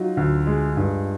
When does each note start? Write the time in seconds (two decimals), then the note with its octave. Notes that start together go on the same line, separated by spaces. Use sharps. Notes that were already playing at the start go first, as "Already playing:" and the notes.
Already playing: F#3 D#4 F4
0.17 D2
0.47 G#3
0.77 G2